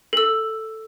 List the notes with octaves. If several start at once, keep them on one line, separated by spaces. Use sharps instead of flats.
A4 E6